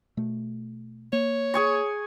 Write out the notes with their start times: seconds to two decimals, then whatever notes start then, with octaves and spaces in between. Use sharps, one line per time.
0.17 B2 A3
1.13 A#3 C#5
1.54 G#4 G#5 C#6